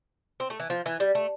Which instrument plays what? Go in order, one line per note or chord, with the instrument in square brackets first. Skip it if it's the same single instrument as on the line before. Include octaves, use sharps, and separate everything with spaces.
[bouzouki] C4
A3
E3
F3
E3
G3
A3